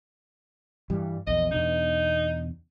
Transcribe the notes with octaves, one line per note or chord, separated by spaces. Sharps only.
G2 E3 G3
A#1 E2 D#5
E2 B2 D4 D#4